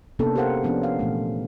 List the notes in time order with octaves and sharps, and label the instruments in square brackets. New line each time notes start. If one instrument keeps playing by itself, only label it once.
[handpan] C3 A#3 B3 C#4 D4 A4
G4 G#4 A#4 C5 F5 F#5
F3 B3 C#4 D4
F5
A#2 E3 A3